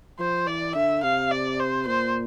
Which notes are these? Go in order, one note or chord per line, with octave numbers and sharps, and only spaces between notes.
F3 C5
E3 D5
D3 E5
C3 F5
D5
C5
A#2 C5